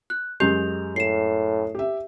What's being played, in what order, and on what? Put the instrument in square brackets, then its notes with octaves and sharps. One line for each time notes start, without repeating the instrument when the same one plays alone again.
[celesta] F#6
[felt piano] F#2 G#3 [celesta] G4 G6 F7
[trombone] A2 [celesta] C7 E7
[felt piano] G4 E5